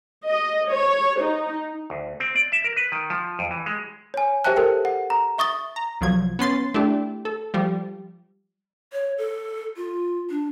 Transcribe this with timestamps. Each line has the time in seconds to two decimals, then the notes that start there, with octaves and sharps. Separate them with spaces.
0.25 D#5
0.68 C#5
1.20 D#4
1.90 D2
2.20 C4
2.36 D5
2.52 E5
2.64 A#4
2.76 B4
2.92 D#3
3.10 F3
3.39 F2
3.51 E3
3.66 G#3
4.14 C#5 G#5
4.44 G4 C5 E5 G5 A5 F#6
4.56 A4 A#4 G5
4.85 F#5
5.10 A#5
5.38 E5 C#6 D#6 A6 G7
5.76 A#5
6.01 C2 F3 F#3 G#6
6.39 B3 C#4 C6 A6
6.74 A3 D4 E4 G4
7.25 A4
7.54 F3 G3
8.93 C#5
9.18 A4
9.77 F4
10.30 D4